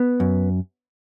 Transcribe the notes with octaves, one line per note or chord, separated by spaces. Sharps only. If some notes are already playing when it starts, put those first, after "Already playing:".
Already playing: B3
F#2